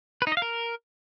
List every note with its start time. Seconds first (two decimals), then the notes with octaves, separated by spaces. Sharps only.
0.22 B4
0.27 D#4
0.32 D#5
0.37 F5
0.42 A#4